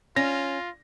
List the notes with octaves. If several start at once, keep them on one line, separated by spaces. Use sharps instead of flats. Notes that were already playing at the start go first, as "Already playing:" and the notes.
C#4 F4 A#6